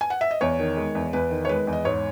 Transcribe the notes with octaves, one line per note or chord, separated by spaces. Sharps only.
G#5
F#5
E5
D#5
E2 C#5
D#3
G#3
E2
E2 B4
D#3
C#5
G#3 B4
E2
D#5
G#2 C#5